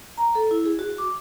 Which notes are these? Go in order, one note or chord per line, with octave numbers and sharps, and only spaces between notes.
A#5
A4
E4
G#4
F#4
D6